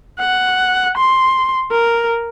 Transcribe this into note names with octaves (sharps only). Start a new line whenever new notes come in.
F#5
C6
A#4